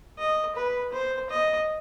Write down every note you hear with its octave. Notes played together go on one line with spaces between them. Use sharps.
D#5
B4
C5
D#5